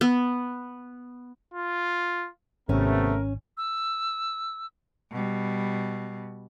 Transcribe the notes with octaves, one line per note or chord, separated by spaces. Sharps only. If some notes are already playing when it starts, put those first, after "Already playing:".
B3
F4
G#1 C3 A3 B3 C#4 A#4
E6
B2 G3